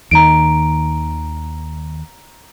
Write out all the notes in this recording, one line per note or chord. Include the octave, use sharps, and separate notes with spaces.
D#2 D#3 A#5 D7